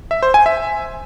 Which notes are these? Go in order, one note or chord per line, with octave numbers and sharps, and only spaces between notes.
E5
C5
G#5
E5